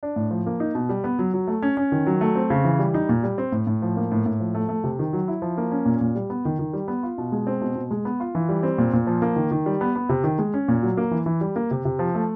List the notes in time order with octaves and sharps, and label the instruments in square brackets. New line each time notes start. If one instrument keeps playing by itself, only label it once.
[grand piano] D4
A2
F3
A#3
D#4
B2
G3
B3
F#3
F#3
A3
C#4
C#4
D#3
F#3
A3
C4
C#3
E3
G3
D#4
A#2
G3
C4
A2
A2
F3
A#3
A2
A2
F3
A3
A3
C3
D#3
F#3
E4
F3
A#3
C#4
A#2
A#2
G3
B3
D#3
D#3
G3
B3
F4
B2
G#3
C4
B2
B2
G#3
B3
F4
E3
G3
C4
A#2
A#2
F3
A#3
D#3
D#3
G3
B3
B3
C3
D#3
G#3
C#4
A#2
F#3
A#3
E3
E3
G3
A#3
C3
C3
F3
A3